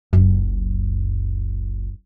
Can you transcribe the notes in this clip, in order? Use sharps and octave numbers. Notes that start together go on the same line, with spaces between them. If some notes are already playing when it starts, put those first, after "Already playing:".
F#1 C#2 F#2